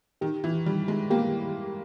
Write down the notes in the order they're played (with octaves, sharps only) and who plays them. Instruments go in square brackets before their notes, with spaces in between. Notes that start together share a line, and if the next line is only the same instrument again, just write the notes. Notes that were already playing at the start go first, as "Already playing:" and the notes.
[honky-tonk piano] D#3 [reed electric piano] G4
[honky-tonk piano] E3
[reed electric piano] D#3 [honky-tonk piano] G3
[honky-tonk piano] G#3
[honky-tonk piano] A#3 [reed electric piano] G4